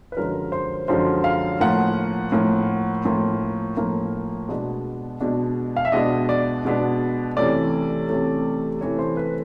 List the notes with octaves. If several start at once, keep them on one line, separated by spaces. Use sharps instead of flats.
B4
F#2 D3 F3 G#3 A#4
C5
F#2 D3 F3 G#3 C5
F5
A2 F3 A#3 F#5
A2 F3 A#3
A2 F3 A#3
A2 F3 A#3
B2 G#3 B3 D4
B2 G#3 B3 D4
F5
E5
B2 G#3 B3 D4 D#5
D5
B2 G#3 B3 D4
C3 E3 A3 C#4 D5
C3 E3 A3 C#4
C3 E3 A3 C#4 C#5
C5
B4